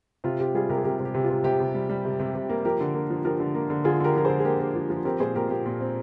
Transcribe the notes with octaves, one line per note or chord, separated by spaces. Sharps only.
C3 F4
C3 G4
G3 F4 G#4
C3 G4 A#4
G#4
C3 G4 A#4
C3
G4
C3
F4
C3
C3 G4
C3
G3
G3
C3
C3
C3
A#3
F3 G4 A#4
D3
A#3
F3
F3 G4 A#4
D3
A#3
D3
D3 F4 G#4
D3 G4 A#4
F3 A#4
D3 G#4 C5
G#4
A#3 G4 A#4
A#3
F3
F3
C4 G4 A#4
A#2 G#4 C5
A#2 G4 A#4
A#2 G4
A#2
C4